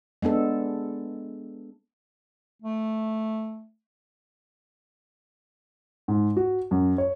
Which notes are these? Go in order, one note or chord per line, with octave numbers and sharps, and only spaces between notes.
G#3 B3 D4 A4
A3
G#2
F#4
F#2
C#5